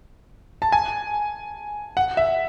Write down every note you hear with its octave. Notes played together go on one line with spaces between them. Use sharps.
A5
G#5
F#5
E5